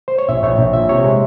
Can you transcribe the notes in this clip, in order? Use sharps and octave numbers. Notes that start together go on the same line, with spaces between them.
C5
C#5
A#1 E5
A#1 C#5
A#1
A#2 E5
C3 C#5
G#3